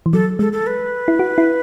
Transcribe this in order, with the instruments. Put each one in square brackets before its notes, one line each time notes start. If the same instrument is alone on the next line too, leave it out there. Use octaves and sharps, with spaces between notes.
[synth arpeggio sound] E3
[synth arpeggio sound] F#3 [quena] A4
[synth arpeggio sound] G#3 [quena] A4
[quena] A4
B4
[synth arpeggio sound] E4
F#4
E4